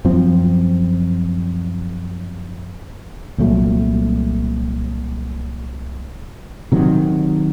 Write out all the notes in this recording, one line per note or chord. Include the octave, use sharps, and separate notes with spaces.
F#2 F3 C4
C2 A#2 F#3 A3
C3 D#3 F#3